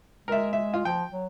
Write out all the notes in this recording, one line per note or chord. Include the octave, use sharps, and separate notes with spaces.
G#3 A#4 E5
E5
F4
F3 G5
F#3